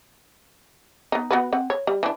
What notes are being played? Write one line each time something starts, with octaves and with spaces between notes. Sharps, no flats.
B3 D#4
B3 F#4 B4
C4 F#5
C#5
G3
E3 D4